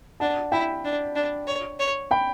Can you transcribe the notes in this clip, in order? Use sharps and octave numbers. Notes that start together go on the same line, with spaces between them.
D4 F#5 A5
E4 G5 B5
D4
D4
C#5
C#5
G5 B5